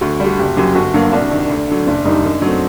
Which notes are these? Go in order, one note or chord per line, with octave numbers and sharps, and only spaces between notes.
D2 F#4
D3 G3
F#4
F#1 G4
F#2 F#3 G4
G1 F#4
G2 F#3 A#3
C2 D4
C3 D#3
D2
D3 F#3
F#1 D4
F#2 D#3 G3 D#4
F#2
F#3 A3 C4